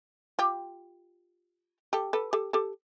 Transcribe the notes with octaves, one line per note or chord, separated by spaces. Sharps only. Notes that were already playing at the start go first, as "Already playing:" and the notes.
F4 G4
G4 A4
A4 B4
G4 A4
G4 A4